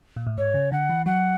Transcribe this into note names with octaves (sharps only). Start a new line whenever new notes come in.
A#2
A2
G#2 C#5
C#3
D3 F#5
E3
F#3 F#5